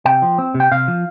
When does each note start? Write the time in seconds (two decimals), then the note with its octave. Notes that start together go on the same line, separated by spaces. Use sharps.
0.06 C3 G5
0.22 F3
0.38 C4
0.54 C3
0.60 G5
0.72 C3 F5
0.88 F3